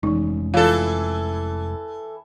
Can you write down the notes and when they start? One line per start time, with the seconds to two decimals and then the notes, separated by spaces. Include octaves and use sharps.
0.03 F1 E3 G#3 C#4 D#4
0.54 E3 F4 A4 C#5 F5